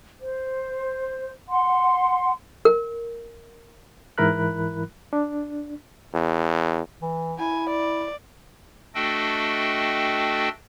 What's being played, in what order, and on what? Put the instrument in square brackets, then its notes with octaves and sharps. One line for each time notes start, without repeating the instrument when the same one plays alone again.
[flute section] C5
F#5 C6
[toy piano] A#4
[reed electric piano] G#2 E3 E4 A#4 B5 F#6
D4
[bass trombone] E2
[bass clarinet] E3
[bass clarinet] E4 [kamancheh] G#5
[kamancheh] D5
[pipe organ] A3 D4 F#4 A4 D#5 G5